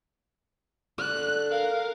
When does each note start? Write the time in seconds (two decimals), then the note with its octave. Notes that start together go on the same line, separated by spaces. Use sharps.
0.98 D3 F#6
1.51 A#4 F5